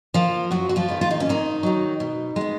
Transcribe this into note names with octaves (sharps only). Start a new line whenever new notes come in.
F3 A#3 F4
F#2 F#3 F#4
F#4
F3 F4
D#3 G#3 B3
F4
D#4
C#4
G#2 D#3 D#4
D#3 F#3
B2
G#3 B3